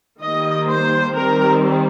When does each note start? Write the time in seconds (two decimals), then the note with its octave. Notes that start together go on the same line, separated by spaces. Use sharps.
0.22 D#3 G3 A#3 D#5
0.69 C5
1.16 D#3 G3 C4 A#4